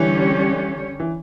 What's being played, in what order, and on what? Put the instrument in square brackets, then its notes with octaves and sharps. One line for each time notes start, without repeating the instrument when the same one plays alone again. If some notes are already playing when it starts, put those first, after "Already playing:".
Already playing: [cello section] D3 G3 C#4 G4 C#5 [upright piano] E3
[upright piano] E3